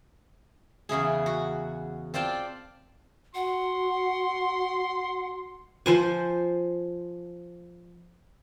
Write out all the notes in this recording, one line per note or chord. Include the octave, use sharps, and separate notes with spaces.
E2 C#3 E4 G#4
F#4
C4 F4 D5 G5 A5
F#4 F#5 C6
F3 C5 G#5